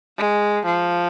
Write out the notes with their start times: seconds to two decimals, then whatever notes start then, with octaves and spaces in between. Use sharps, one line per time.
0.18 G#3
0.66 F3